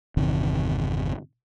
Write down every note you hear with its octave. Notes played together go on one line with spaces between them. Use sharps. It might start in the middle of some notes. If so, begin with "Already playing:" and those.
G1 E2 C3 D#3